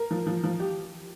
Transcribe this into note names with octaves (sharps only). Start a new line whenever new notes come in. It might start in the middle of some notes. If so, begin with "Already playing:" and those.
Already playing: A#4
F3
F3
F3
G4